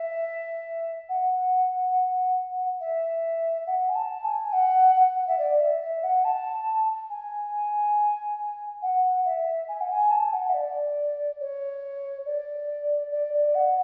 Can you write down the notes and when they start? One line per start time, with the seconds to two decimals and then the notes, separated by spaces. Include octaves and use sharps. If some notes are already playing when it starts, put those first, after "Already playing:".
Already playing: E5
1.09 F#5
2.81 E5
3.67 F#5
3.89 G#5
3.95 A5
4.24 G#5
4.53 F#5
4.96 F#5
5.28 E5
5.39 D5
5.60 E5
5.82 E5
6.03 F#5
6.24 A5
7.10 G#5
8.82 F#5
9.25 E5
9.68 G#5
9.81 F#5
9.90 G#5
10.11 A5
10.24 G#5
10.33 F#5
10.49 E5
10.54 D5
11.40 C#5
12.26 D5
13.12 D5
13.34 D5
13.55 F#5